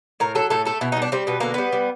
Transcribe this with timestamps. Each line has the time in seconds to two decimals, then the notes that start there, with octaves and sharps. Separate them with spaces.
0.20 A2 A#4
0.35 F#3 A4
0.50 A2 A4
0.65 A3 A4
0.81 B2 E4
0.92 D#4
0.97 G3
1.02 D4
1.12 G3 C4
1.27 B2 B3
1.40 D3 A#3
1.54 G3 B3
1.72 G3